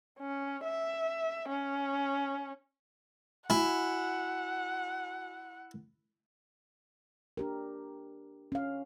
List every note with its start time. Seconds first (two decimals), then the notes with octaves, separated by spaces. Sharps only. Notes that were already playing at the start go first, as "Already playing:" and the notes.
0.19 C#4
0.65 E5
1.49 C#4
3.50 E4 F#4 F#5 G#5
7.37 D4 G4 A#4
8.52 C#4 F5